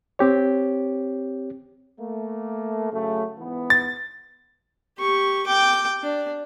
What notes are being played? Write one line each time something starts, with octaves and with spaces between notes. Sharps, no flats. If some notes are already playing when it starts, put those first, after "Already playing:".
C4 G4 C#5
A3 A#3
C#3 F#3 A3
G#2 E3 B3
A6
G4 C#6
G5 D6
D4